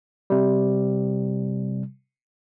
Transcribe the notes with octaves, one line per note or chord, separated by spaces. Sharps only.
C3 G3